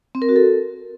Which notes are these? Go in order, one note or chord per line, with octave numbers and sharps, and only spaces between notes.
C4
A#4
F#4
A4